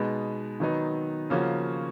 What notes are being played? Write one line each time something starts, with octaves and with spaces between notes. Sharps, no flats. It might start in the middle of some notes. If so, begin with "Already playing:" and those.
Already playing: B2 G#3 B3 D#4
D#3 F#3 B3 D#4
C#3 F3 A#3 C#4 F#4